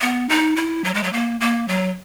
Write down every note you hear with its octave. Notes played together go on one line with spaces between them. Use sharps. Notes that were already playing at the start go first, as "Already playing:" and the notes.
B3
D#4
E4
F#3
G#3
F#3
A#3
A#3
F#3